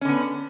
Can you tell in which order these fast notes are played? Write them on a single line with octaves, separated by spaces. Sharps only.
C#4 D3 B3